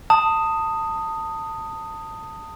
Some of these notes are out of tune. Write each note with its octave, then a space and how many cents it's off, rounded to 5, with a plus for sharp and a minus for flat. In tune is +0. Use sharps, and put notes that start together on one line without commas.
A5 +25 D#6 +0